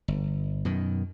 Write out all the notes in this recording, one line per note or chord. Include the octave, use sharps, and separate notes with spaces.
G1
F#2 B2 D#3